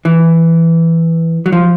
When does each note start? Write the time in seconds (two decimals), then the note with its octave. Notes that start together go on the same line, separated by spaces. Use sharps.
0.05 E3
1.46 F#3
1.52 F3